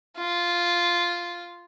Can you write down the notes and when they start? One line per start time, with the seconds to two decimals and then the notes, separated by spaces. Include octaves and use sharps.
0.17 F4